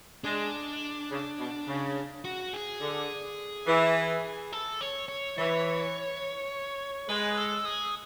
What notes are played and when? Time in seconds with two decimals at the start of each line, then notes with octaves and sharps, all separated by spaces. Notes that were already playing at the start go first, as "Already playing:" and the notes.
0.24 G#3 D4
1.10 C#3
1.39 B2
1.67 C#3
2.25 F#4
2.53 G#4
2.81 D3
3.66 E3
4.53 A4
4.81 C#5
5.08 C#5
5.37 E3 C#5
7.08 G#3 B4
7.37 A4
7.65 G#4